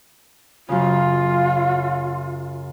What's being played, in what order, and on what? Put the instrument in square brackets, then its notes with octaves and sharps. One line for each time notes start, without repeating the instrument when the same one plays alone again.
[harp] F#2 C#3 [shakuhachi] F4